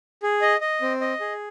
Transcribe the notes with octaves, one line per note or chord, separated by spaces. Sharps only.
G#4
D#5
D#5
C4
D#5
G#4